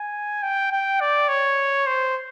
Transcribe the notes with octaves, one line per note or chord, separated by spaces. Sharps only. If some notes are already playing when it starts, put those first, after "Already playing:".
Already playing: G#5
G5
G5
D5
C#5
C5